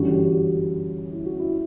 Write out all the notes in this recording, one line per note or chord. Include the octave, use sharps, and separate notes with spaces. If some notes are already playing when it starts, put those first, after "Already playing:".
Already playing: G1 F#2 E3 G3 F#4
G4
F#4
E4
F#4
E4